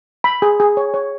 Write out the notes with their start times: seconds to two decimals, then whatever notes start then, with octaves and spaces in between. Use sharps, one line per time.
0.24 B5
0.42 G#4
0.60 G#4
0.77 C#5
0.94 C#5